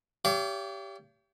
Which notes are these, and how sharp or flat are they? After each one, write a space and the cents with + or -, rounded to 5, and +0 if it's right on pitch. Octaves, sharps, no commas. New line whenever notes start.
G4 +0 C#5 +45 F5 -45